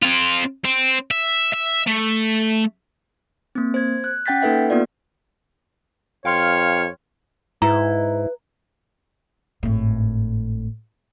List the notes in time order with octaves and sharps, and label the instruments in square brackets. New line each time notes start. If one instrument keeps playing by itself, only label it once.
[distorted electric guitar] C4 F4
C4
E5
E5
A3
[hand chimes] A#3 C4
C5 G#6
F#6
C#4 F#5 G5 G6 A6 B6
A#3 D#4 A4 B4 E5 F#5
A#3 B3 F4 D5
[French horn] F2 [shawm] C#5 [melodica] F5 [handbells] G5 C6 F6
[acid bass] G#2 [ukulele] E4 [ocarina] B4 [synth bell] A#5
[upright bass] G#1 A2